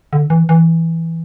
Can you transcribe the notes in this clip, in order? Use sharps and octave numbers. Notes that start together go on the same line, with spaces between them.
D3
E3
E3